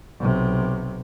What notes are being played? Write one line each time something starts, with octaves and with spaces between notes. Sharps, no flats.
B1 C3